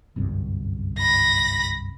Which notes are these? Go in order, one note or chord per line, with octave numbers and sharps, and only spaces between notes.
G1 C2 F#2
B5 A#6